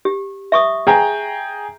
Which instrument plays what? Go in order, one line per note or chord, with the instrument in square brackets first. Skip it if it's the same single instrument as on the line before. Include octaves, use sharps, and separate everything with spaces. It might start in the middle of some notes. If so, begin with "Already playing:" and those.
[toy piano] G4
E5 C#6 D#6
[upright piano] G#4 G5 A#5